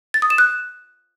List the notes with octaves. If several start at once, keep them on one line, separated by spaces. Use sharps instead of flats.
A6
D#6
E7
F#6